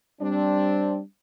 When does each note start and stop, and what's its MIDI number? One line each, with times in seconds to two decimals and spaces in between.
0.21 1.00 55
0.21 1.00 60
0.21 1.00 62